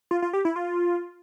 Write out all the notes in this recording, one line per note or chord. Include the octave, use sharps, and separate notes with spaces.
F4
F4
G4
E4
F4